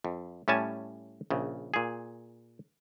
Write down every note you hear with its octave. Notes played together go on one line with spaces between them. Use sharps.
F2
A2 G3 C#4 G#5 A5
A#1 C#3
A#2 G#4